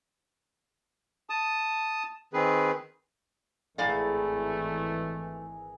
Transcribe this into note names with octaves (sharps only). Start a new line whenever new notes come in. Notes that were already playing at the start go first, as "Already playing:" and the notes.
A5 D#6
D#3 C4 G#4 B4
G#1 A2 E3 A3 G#4 A#4 D5 F5